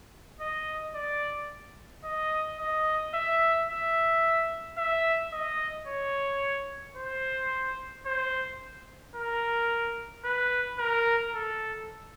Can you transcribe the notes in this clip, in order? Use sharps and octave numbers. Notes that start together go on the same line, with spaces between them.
D#5
D5
D#5
D#5
E5
E5
E5
D#5
C#5
C5
C5
A#4
B4
A#4
A4